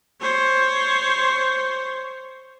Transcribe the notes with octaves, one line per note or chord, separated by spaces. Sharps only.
C5 C#5